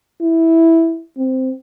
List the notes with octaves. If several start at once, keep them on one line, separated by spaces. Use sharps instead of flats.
E4
C4